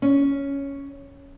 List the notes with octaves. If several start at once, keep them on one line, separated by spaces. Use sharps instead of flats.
C#4